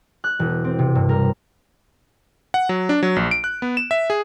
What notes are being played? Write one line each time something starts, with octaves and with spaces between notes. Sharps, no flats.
F#6
E1
C4
C3
G2
A#4
F#5
F#3
D4
F#3
A#1
D7
F#6
B3
E7
E5
G#4